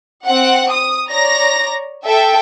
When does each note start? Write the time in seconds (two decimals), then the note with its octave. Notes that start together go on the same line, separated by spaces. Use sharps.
0.24 C4 F#5
0.71 D#6
1.08 C#5 D5 A#5 A#6
2.05 A4 E5 G5